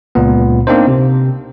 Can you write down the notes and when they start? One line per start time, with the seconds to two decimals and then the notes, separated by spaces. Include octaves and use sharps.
0.15 C#2 A#2 B3
0.67 A#3 C4 D4 D#4 C5
0.88 C3